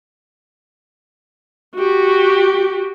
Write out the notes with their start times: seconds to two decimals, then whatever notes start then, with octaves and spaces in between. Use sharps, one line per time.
1.76 F#4 G4